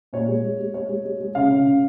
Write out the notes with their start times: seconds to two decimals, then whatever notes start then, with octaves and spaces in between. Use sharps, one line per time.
0.13 A#2 C#5
0.28 G#3
0.43 G#3
0.59 G#3
0.74 G#3 C#5
0.89 G#3
1.05 G#3
1.20 G#3
1.35 C#3 F5
1.51 C#3
1.66 C#3